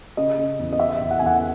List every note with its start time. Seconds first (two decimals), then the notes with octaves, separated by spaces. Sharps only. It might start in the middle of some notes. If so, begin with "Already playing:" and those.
0.17 C#3 D#5
0.38 C#3
0.59 E2
0.73 D#5
0.79 C#3 E5
1.01 E2
1.11 F#5
1.19 G#5
1.22 E2 F#5